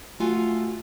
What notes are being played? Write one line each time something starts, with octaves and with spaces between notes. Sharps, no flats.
A3 F4 F#4 G#5